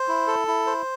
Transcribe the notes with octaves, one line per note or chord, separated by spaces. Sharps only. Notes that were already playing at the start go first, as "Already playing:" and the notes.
Already playing: C5
E4
A4
E4
C5